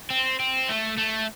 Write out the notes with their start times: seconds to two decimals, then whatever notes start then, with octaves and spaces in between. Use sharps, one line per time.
0.10 C4
0.40 C4
0.69 A3
0.97 A3